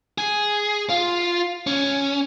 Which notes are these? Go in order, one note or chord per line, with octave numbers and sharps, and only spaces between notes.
G#4
F4
C#4